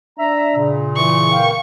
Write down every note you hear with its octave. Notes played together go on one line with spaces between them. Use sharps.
D4 E5 A#5
A#2 C#3
E3 C#6
A#3 F5 G5